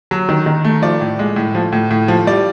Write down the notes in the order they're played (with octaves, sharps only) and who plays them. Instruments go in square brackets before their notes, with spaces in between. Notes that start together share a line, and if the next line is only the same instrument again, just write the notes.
[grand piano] F#3
D#3
D#3
A3
F3 D5
A2
G#3
A2
F3
A2
A2
F3
G3 D5